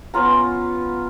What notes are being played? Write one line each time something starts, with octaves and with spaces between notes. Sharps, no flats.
B3 C#4 F4 A#5